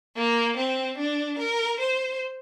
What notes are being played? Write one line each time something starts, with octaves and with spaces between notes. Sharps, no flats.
A#3
C4
D4
A#4
C5